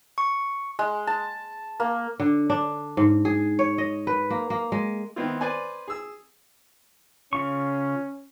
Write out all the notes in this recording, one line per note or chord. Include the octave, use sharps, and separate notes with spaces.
C#6
G#3
A5
A#3
D3
D4
G#2
G#4
C#5
D#5
B4
A#3
A#3
G#3
D#3 B3 C4 E4 F4
B4 C5 D5 G#5
G#4 E6
C#3 C#4 F4 C#6